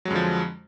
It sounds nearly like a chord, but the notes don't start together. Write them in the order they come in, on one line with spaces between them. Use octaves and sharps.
F#3 G#3 F2 D3 F3